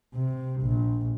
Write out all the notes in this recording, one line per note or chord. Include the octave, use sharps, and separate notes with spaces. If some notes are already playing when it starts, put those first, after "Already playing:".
C3
A#1